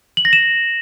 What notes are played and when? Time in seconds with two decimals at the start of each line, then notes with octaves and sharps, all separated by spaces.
0.17 F#7
0.25 A#6
0.33 E7